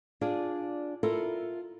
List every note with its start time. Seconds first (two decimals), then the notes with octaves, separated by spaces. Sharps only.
0.21 D4 F4 G#4 D5
1.03 E4 F4 A4 A#4